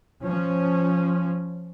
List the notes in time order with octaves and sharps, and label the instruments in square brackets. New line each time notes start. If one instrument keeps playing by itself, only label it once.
[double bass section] F3 C#4